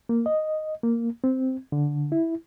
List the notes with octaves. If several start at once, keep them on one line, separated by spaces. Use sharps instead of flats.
A#3
D#5
A#3
C4
D3
E4